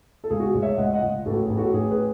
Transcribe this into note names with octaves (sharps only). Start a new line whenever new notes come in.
A4
C#2 G#4
F#4
G#4
C#2
C#5 E5
C#2 D#5 F#5
D#5 F#5
C#2
A1 F#4 A4
G#4
A1
F#4 A4
A1 G#4
G#4 B4